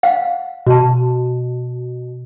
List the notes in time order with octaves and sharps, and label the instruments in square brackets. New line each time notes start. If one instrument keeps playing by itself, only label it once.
[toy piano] F5 F#5
[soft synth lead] B2 [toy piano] F#4 A5